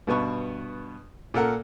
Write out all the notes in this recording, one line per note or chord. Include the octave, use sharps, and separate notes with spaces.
G2 B2 B3 C#6
A#2 A4 A#4 F#5